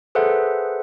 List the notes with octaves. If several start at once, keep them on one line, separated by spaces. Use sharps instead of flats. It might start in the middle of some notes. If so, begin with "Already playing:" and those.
G#4 A4 B4 C5 E5 F#5